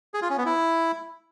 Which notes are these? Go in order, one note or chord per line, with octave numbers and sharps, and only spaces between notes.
G#4
F4
C#4
B3
E4